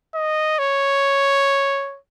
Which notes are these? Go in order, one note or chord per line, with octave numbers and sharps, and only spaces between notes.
D#5
C#5